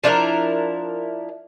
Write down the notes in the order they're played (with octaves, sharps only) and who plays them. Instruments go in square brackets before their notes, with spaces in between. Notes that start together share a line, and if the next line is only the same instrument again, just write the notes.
[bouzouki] F3 D4 E4 A#4